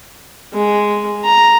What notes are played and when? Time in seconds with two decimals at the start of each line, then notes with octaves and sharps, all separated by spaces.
0.53 G#3
1.24 A#5